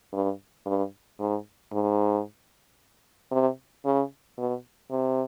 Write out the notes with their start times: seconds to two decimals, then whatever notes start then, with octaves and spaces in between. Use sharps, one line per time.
0.13 G2
0.66 G2
1.19 G#2
1.72 G#2
3.31 C3
3.85 C#3
4.37 B2
4.90 C3